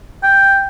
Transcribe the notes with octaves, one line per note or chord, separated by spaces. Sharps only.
G5